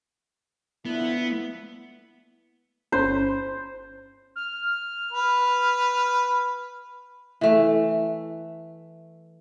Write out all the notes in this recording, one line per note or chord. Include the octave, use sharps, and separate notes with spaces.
D3 F3 B3 E4
G1 C#4 C5 B5
F6
B4
E3 A3